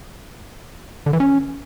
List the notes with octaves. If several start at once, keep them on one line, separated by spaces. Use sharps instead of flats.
D3
E3
C#4